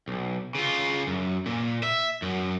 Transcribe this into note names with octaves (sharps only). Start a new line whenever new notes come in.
B1
C#3 F4
F#2
A#2
E5
F#2